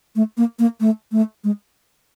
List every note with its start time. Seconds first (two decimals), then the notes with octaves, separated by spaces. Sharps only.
0.16 A3
0.37 A#3
0.59 A#3
0.80 A3
1.12 A3
1.44 G#3